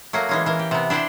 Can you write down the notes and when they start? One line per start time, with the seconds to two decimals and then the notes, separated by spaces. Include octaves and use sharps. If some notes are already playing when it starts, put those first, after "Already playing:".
0.13 F#3 A3 A#3
0.29 E3 G#3 C#4
0.46 E3 A#4
0.59 G4
0.71 C3 B3
0.90 D4 E4 G4 C5